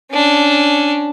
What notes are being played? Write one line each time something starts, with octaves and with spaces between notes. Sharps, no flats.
C#4 D4